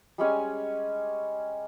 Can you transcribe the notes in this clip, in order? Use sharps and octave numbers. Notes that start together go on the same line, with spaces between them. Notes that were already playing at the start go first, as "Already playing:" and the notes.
G3 G#3 C#4 G#5